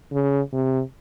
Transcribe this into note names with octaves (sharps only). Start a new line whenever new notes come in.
C#3
C3